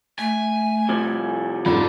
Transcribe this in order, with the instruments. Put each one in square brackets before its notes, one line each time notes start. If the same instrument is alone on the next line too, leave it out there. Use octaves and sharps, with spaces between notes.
[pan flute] A3 [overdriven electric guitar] G#5
[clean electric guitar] C3 F3 G3
[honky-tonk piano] F2 G#2 [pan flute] C#4 [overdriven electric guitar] D5 F#5